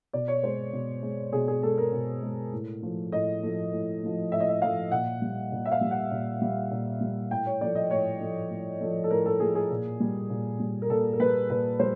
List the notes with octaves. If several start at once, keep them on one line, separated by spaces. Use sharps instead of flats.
B2 D5
C#5
G#3 C5
B2
G#3
B2 G#4
G#4
G#3 A4
A#4
B2
G#3
A2
F3 A3
A2 D#5
F3 A3
A2
F3 A3
A2 E5
D#5
E5
F3 A3 F5
A#2 F#5
G3
A#2
E5
F5
G3
F#5
A#2
G3
A#2
G3
A2 G5
C#5
F3 A3 D5
D#5
A2 C#5
F3 A3
A2
F3 A3
A4
A2 A#4
A4
F3 A3 G#4
G#4
A#2
G3
A#2
G3
A#4
A#2 A4
A#4
G3 B4
A#2 B4
G3 C5